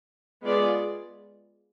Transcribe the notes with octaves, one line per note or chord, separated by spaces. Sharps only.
G#3 B3 F4 G#4 D5